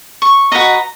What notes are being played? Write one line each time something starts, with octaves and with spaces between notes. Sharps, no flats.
C#6
F#4 B4 D#5 A#5